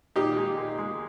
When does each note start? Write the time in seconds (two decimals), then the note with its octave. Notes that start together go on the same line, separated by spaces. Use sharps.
0.16 A#2 D#4 G4
0.37 G#3
0.58 A#2
0.79 G#3